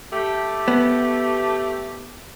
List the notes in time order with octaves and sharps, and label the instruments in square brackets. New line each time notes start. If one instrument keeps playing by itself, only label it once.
[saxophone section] A3 G4
[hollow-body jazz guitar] B3